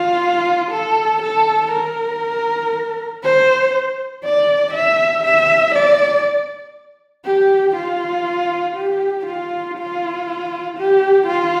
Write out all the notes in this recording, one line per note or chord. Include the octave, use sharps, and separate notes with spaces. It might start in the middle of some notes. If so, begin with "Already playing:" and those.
Already playing: F4
A4
A4
A#4
C5
D5
E5
E5
D5
G4
F4
G4
F4
F4
G4
F4